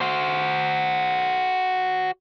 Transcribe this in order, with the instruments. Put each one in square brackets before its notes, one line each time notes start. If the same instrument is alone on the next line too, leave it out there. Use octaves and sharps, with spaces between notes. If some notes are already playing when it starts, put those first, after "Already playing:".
[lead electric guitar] F#4 C5